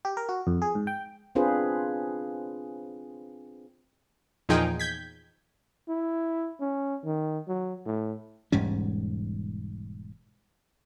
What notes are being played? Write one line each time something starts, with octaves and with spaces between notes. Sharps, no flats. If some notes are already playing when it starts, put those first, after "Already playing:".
G4
A#4
F#4
F2
G#4
G#2
G5
C4 D4 F4 G#4 B4 C5
E2 A#2 F3 D#4 G#4 G5
G6 G#6 B6
E4
C#4
D#3
F#3
A2
E1 G#2 G3 C#4